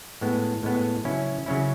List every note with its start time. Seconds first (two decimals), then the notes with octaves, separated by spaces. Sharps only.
0.21 A2 G#3 B3
0.63 A2 G#3 B3
1.04 C#3 F#3 C#4 E4
1.46 C#3 F#3 C#4 E4